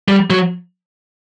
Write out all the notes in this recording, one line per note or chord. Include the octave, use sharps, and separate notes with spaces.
G3
F#3